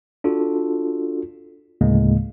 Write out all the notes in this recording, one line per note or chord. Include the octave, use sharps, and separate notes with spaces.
D4 F4 F#4 A4
D2 A2 C#3 G#3 A#3